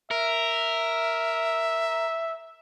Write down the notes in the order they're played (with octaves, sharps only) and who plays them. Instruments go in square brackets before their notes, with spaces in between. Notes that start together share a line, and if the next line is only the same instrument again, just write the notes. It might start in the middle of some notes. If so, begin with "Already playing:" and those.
[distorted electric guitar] A#4 [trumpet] E5